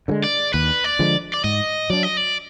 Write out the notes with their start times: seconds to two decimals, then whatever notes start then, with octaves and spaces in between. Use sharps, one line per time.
0.08 D3 F3 G#3
0.24 D5
0.53 D#2 B4
0.84 D5
0.99 D3 F3 G#3
1.34 D5
1.44 G#2 D#5
1.90 F#3 D4 D5
2.03 D#5
2.17 D5